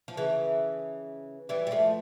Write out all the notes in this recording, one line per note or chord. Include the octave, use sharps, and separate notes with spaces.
F3
C#3 E3
E3 G3
G3
F3 A3